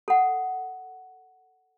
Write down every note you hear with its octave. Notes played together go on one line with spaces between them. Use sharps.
A4 F#5